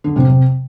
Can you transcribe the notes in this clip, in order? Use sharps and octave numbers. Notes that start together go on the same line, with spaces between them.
D3
C3
C3